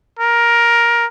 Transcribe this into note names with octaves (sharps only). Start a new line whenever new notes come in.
A#4